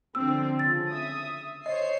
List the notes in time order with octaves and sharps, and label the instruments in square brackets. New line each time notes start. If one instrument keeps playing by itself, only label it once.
[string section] D3 F3 C4 [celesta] E6
[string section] C#3 F3 [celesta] A6
[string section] E5 D#6
[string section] C5 C#5 C7 [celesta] D#5